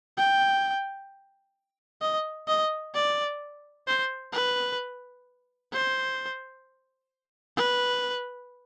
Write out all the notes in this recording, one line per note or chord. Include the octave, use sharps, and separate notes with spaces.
G5
D#5
D#5
D5
C5
B4
C5
B4